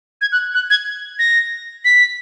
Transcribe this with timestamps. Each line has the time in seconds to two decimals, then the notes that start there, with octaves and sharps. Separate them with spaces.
0.21 G#6
0.32 F#6
0.54 F#6
0.70 G#6
1.19 A#6
1.85 B6